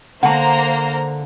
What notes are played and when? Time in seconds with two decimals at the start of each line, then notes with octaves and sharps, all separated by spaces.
0.23 D3 A#3 C5 F#5 A5 A#5